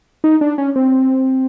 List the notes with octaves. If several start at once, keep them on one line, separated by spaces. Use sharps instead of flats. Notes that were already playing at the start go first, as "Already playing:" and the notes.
D#4
D4
C#4
C4